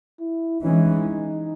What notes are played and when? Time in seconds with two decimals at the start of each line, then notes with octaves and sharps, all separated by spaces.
0.20 E4
0.61 E3 G#3 C#4 D#4